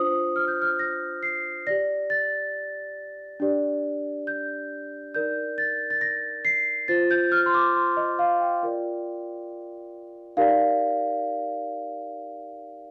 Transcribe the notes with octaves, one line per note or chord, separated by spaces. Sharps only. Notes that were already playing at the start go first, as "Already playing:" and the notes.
Already playing: D4 F4 C5 D#6
F6
G6
F6
A#6
C7
G4 D5 A#6
A6
D4 G4 D5
G6
D#4 A#4 D5 G6
A6
A6
A#6
C7
F4 C5 A6
G6
F6
C6
D6
C6
D#5
F5
G5
F4 A#4 D5
D#4 G4 A#4 D5 F5